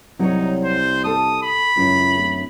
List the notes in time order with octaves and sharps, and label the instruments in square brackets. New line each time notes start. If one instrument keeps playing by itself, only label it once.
[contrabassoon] C2 [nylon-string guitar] F#3 C#5 [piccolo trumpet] D#4
[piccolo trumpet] C5
[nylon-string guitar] A4 A5 [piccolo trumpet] D#6
[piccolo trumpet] B5
[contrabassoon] C#2 [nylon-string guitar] F#2 E4
[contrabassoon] D1